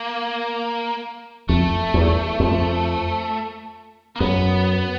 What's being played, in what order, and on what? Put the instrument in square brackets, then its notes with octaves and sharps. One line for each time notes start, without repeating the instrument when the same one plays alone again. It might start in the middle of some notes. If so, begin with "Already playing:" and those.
Already playing: [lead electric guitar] A#3
[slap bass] F2 [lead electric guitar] A3
[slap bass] E2
F2
[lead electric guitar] A#3
[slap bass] F#2 [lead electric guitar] B3